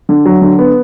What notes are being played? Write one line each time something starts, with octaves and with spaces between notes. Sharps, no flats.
D3
F#3
D3
B3